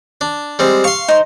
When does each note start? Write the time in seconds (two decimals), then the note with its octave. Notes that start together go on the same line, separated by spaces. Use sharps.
0.21 D4
0.59 G3 G#3 C4
0.84 F5 C6 C#6
1.08 D#4 C5